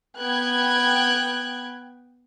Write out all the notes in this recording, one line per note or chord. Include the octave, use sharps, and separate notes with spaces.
B3 G5 F#6 G#6